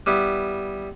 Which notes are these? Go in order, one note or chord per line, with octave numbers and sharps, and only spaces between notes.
G3 B3 E4